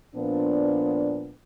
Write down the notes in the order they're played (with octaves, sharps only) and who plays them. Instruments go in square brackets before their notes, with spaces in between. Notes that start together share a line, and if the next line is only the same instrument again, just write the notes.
[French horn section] A#2 F3 B3 D4